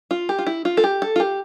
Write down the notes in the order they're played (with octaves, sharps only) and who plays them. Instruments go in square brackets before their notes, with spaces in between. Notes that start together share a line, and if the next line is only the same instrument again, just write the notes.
[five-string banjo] F4
G4
F4
E4
F4
A4
G4
A4
F4
G4